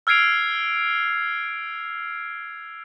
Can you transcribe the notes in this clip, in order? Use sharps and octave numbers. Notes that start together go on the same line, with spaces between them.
E6 F6 G#6 C7 D7 F7